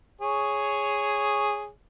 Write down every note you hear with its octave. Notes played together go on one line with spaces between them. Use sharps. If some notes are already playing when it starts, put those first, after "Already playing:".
G#4 C#5